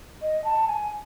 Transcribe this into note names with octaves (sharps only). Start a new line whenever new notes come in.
D#5
A5
G#5